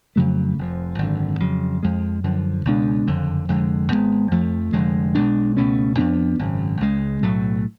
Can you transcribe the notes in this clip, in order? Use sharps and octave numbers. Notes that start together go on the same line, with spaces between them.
F2 C#3 F#3 A3
F1 F2 F3
G#1 F#2 D3
F2 C#3 F#3
F2 F3 G#3
F#2 D3 F3
C#2 B2 G#3 D4
F#1 F2 D3
F1 F2 D3 G#3
G#1 G#2 G#3 B3
F2 F3 A3
F1 F2 D3 G#3
B1 B2 G#3 D4
C#2 B2 A3 C#4
F2 F3 B3 D4
G#1 F#2 C#3
C#2 C#3 G#3
B1 A2 F#3 A3